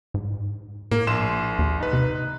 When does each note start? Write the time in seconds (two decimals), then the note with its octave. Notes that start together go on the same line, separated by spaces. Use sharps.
0.14 G#2
0.91 A2 A#3
1.07 A#1 C6 E7
1.59 D#2
1.80 D#4 B4
1.93 C3